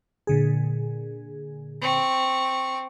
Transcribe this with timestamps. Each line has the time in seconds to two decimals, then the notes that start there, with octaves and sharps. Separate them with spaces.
0.27 A#2 D3 G#4
1.81 C4 C#6